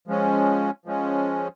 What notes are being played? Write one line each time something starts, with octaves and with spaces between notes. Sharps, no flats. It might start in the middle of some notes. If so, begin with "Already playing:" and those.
F3 G#3 C#4
F3 G#3 C#4